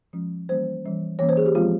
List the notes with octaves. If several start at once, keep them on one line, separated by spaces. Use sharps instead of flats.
F3 G#3 C#4
E3 G3 A#3 C#4 C5
E3 G3 C#4
E3 A#3 C#4 C#5
C5
G#4
G4
F3 G#3 C4 F4